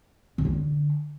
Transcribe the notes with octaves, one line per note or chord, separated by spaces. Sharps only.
C#3
D3